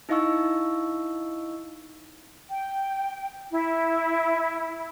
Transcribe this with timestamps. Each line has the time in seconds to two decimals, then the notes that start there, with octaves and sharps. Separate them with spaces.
0.09 D#4 E4 D#5 F5 C#6 E6
2.49 G5
3.51 E4